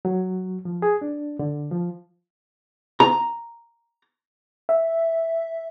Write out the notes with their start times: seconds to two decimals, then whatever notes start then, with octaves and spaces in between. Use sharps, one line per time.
0.05 F#3
0.65 F3
0.82 G#4
1.02 D4
1.39 D3
1.71 F3
3.00 A#5
4.69 E5